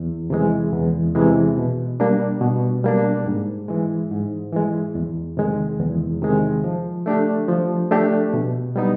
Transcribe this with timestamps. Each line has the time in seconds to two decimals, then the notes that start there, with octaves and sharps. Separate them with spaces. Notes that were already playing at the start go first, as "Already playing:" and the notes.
Already playing: E2
0.30 C3 E3 G#3
0.72 E2
1.15 C3 E3 G#3
1.57 B2
2.00 G3 A#3 D4
2.41 B2
2.84 G3 A#3 D4
3.26 G#2
3.68 E3 G#3
4.11 G#2
4.52 E3 G#3
4.95 E2
5.37 C3 D#3 G#3
5.80 E2
6.22 C3 D#3 G#3
6.64 F3
7.06 A3 D4 G4
7.48 F3
7.91 A3 D4 G4
8.33 B2
8.76 G3 B3 D#4